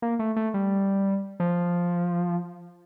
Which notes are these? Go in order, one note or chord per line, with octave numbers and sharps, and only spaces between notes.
A#3
A3
A3
G3
F3